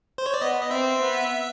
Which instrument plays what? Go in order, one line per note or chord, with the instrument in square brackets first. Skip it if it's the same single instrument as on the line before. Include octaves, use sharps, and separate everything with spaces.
[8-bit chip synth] C5
C#5
D5
[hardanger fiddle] B3 [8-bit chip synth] D#5
[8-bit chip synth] D#5
[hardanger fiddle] C4 [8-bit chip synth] E5
[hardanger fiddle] B3